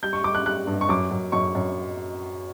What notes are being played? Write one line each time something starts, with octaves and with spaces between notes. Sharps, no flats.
G3 G6
C#6
G3 D6
F#6
G3 F#6
G2
C#6
F#2 D6
F#2
F#2 C#6
F#2